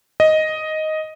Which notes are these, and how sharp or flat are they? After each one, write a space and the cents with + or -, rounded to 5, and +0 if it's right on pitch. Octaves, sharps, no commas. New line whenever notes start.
D#5 +5